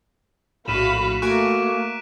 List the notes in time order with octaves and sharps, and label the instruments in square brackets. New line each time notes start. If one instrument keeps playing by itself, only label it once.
[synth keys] A#1 A2 [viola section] F#4 F5 B5 [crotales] B6 D#7 E7
[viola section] A3 [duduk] A#3 [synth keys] F#4 G#5 [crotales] C#6 F#6 D7